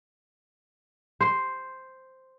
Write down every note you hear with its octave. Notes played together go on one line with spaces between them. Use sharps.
C5